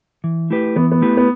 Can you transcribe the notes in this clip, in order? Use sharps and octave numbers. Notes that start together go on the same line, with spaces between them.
E3
A3 E4 G4 B4
E3 B3
B3
A3 E4 G4 B4
B3